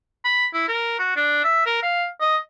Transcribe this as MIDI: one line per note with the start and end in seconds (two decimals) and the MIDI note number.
0.25 0.46 83
0.53 0.67 64
0.68 0.97 70
0.99 1.12 66
1.16 1.40 62
1.44 1.64 76
1.66 1.80 70
1.82 2.06 77
2.20 2.37 75